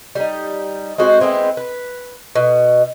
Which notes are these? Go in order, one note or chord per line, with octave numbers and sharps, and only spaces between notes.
G3 D#4
G#3 C4 F#4 C5
G#3 B3 C4 E4
B4
B2